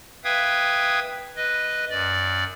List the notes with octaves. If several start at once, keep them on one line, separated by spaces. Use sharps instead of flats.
B4 E5 F5 G5 D#6 G#6
B4 D#5
F#2 D5